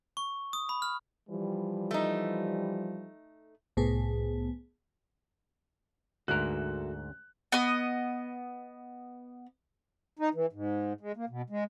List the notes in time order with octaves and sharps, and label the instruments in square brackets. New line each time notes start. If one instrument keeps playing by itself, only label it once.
[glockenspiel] C#6
D#6
B5
F6
[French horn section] E3 F3 G3
[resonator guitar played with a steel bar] A3 D#4
[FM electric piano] C2 A2 B3 G#4
[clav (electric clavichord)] D2 G#2 A#4 [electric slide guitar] F#4 A4 E5 [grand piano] F#6
[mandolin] B3 D#5
[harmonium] D#4
E3
G#2
G#3
A#3
B2
G#3